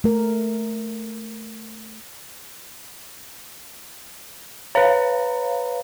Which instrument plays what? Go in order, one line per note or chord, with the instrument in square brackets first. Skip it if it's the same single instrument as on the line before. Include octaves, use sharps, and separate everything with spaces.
[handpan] A3 A#4
[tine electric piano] B4 A#5 [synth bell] C#5 F5